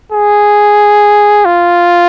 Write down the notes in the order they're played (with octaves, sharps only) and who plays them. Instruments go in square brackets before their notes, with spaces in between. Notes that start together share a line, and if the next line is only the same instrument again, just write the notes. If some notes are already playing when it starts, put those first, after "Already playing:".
[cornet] G#4
F4